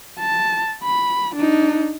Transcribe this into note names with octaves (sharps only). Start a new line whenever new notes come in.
A5
B5
D4 D#4